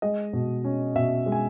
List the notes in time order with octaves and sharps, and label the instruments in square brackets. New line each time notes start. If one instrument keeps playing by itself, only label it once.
[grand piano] G#3 D#5
B2
C#4
B2 E5
G#3
G#5